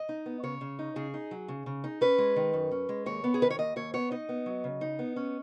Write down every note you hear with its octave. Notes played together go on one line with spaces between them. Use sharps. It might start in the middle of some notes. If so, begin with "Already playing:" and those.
Already playing: D#5
D#4
B3
C#3 C#5
C#3
D#4
C#3 G#4
D#4
F#3
C#3
C#3
D#4
C#4 B4
G#3
D#3
F#2
C#4
G#3
D#2 C#5
B3
G#4
D#3 B4
C#5
D#2 D#5
D#2 C#5
B3 C#5
D#4 D#5
B3
F#3
C#3
D#4
B3
C#4